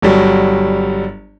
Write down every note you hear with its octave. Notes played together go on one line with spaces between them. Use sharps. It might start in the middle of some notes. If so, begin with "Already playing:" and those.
G1 F#3 G3